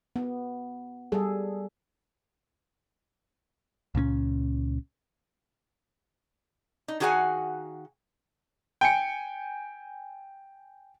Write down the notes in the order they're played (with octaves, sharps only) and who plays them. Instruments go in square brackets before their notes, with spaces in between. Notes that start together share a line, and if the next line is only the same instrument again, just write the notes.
[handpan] B3
G3 G#4 A4
[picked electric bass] C#2 A#2 C4 C#4
[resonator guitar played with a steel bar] D#4
D#3 F#4 G#4 F5 F#5 G#5
[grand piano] G5 G#5 C#7